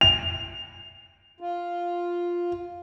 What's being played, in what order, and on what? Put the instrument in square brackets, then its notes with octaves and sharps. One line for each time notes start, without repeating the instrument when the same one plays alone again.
[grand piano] F7
[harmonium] F4